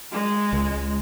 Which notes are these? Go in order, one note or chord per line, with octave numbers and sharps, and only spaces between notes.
G#3
C#2